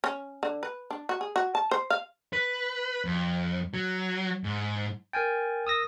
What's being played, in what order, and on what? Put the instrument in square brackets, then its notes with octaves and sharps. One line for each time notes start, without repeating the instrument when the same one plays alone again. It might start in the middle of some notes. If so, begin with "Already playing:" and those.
[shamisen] C#4
D3
B4
D4
F#4
G#4
F#4
A5
C5
F5
[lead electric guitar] B4
F2
F#3
G#2
[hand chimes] A#4 F6 A6 [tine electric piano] G5 G#5
[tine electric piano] D#6 E6 A#6